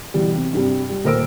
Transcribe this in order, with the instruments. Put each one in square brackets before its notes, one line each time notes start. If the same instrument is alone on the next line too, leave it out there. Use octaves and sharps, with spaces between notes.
[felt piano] B2 E3 G3
C3
G2 C3 G3
G3
D#1 A4 A#4 C5 E6 D7